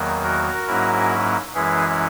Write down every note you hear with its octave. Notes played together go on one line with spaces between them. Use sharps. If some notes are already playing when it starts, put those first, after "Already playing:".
Already playing: E2 D#3 F#3 A#3
F#4 A#4
G#2 F#3 A#3 C#4 E4
F#2 E3 G#3 C#4 E4 G#4 B4